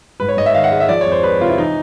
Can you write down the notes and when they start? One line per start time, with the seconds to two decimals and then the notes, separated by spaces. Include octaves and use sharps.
0.20 G#2 B4
0.29 C#5
0.37 G#2 D#5
0.46 E5
0.55 D#3 F5
0.64 F#5
0.71 G#3 F5
0.80 E5
0.89 F3 D5
1.01 C#5
1.07 F2
1.12 C5
1.23 G#3 B4
1.41 C3 F4
1.49 E4
1.57 E3 D#4